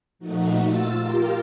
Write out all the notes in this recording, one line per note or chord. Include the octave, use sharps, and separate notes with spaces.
A#2 F3 A3 D#4 F#4
F4 E6 A6
F4 G4 A#4